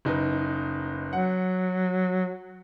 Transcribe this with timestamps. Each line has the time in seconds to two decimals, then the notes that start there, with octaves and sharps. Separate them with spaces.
0.05 F#1 D#4 B4
1.13 F#3 F#5